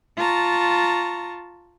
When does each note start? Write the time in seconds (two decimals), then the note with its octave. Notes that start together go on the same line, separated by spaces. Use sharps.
0.18 F4 A5 A#5 C#6